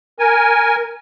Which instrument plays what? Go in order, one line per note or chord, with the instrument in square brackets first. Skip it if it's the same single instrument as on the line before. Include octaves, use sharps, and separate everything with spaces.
[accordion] A#4 G#5